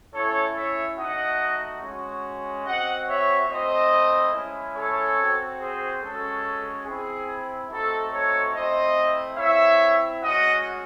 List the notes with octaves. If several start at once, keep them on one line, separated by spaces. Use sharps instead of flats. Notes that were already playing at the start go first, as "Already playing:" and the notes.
A3 C#4 E4 A4 C#5
C#5 E5
A3 D#4 F#4 D#5 F#5
G#3 C#4 F#4
C4 F#4 D#5 F#5
C#5 E5
A3 C4 E4 C5 D#5
G#3 C#4 E4
A4 C#5
C4 F#4
G#4 C5
G#3 C#4 F#4 A4
C4 E4 G#4
A3 C4 D#4 F#4 A4
A4 C#5
A3 C4 E4 C5 D#5
C4 E4 C#5 E5
G#3 C#4 F#4 D#5 F#5